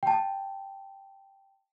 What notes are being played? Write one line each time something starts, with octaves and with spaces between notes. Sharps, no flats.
G5 A5